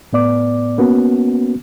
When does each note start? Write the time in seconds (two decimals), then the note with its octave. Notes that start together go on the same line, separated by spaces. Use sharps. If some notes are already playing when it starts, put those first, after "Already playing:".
0.13 A2 B3 D5 D6
0.78 A#3 B3 C#4 F#4